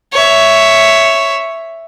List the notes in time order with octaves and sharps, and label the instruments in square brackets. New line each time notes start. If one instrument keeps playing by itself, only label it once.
[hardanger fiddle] C#5 E5